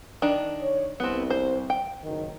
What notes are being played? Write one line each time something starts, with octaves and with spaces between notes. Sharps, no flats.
D#3 D4
C#5
C2 B3 C4
C5
G5
F#1 D#3